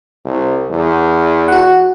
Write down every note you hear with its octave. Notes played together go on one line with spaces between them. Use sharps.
C2
E2
F#4 F#5